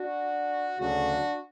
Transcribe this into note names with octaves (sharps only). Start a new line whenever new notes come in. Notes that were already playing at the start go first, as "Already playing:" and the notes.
Already playing: D4 F#4
D2 C#3 F#3 A3 D4 F#4